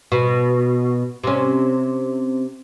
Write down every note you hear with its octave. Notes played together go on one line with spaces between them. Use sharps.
B2
C3 C#4